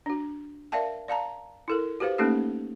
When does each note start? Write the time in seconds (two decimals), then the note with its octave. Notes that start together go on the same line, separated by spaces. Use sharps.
0.06 D4 F#4
0.72 A#4 D5 E5 F5 G5 A5
1.08 D5 F5 A5 A#5
1.68 E4 A4 A#4
2.00 F#4 G4 B4 C5 F5
2.18 A3 A#3 C#4 D#4 G4 A4